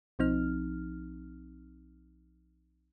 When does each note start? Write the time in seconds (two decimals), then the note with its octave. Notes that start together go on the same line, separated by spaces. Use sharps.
0.19 B1 F3 C4 D#4 F6